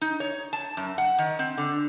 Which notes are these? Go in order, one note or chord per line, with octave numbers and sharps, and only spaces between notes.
D#4
C#5
A5
F#2
F#5
D#3
C4
D3